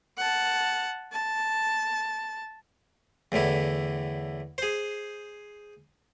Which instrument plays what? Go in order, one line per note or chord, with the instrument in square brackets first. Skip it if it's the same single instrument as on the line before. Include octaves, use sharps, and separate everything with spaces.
[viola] F#5 A5
A5
[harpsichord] E2 A2 D3 E4
G#4 C5